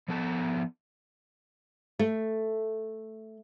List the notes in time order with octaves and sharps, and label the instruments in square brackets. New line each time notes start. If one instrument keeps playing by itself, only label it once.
[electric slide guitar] F3 B3 A4 A5
[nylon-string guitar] A3